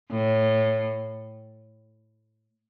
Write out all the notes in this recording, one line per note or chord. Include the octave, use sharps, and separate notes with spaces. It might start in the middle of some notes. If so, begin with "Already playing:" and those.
A2